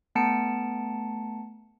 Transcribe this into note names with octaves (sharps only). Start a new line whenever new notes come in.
A3 B3 A5 A#5 C#7 D7